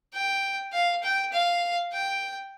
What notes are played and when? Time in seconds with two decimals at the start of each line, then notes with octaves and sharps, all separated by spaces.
0.14 G5
0.73 F5
1.03 G5
1.32 F5
1.92 G5